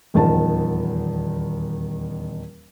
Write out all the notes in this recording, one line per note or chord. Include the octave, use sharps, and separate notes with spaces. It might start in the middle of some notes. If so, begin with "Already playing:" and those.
D#1 E2 D#3 F3 A5